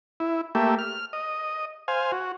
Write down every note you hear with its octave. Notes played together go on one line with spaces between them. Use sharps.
E4
A3 A#3 G4 E5
F6
D#5
C5 F5 G#5
F#4